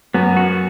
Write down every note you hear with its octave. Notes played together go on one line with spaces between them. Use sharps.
F#2 F#3 B3
F#4